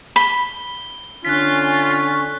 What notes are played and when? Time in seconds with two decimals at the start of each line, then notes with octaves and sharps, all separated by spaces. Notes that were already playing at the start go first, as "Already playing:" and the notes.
0.16 B5 G7
1.25 D3 C#4 F4 F#6 B6